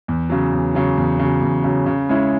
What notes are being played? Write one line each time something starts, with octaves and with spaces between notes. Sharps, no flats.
E2
C#3 F#3
E2
C#3 F#3
E2
C#3 F#3
E2
C#3 F#3
C#3
G#3 C#4 E4